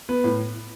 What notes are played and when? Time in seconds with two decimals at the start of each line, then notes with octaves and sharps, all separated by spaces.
0.09 B3 B4
0.24 A2